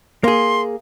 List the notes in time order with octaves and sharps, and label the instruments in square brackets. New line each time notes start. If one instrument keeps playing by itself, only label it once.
[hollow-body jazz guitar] A#3 G#4 [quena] C6